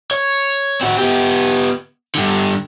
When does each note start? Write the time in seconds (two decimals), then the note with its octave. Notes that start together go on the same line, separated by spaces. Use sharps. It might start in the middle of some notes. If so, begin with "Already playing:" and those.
0.11 C#5
0.81 C4 F#4
0.98 B3 G4
2.15 G2 D3